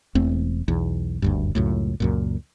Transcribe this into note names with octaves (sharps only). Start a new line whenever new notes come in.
E1 E2 A3 C4
B1 E2
F#1 D2 G2
C#2 F#2 A2
C#2 F#2 A#2